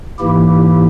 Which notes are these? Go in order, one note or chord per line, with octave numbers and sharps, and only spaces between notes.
G#2 E3 A#3 E4 G4